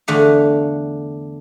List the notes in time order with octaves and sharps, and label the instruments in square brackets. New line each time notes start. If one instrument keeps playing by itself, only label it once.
[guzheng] E2 D3 A3 F5